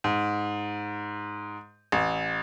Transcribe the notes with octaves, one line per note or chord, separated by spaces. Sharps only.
G#2
A1